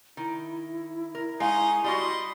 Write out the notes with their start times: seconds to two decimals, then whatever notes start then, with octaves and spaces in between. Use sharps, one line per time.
0.17 D#3 E4
1.15 A#4
1.40 G#3 C#4 D#4 F5
1.84 G3 F4 F#4 B4 D#5 C6